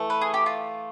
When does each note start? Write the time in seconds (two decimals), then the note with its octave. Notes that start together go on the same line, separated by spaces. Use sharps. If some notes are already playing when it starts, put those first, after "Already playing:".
Already playing: E3 A3
0.10 B4
0.21 G#4
0.34 G4
0.46 F4